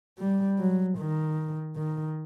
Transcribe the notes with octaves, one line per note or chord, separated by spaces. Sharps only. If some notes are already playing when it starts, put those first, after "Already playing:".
G3
F#3
D#3
D#3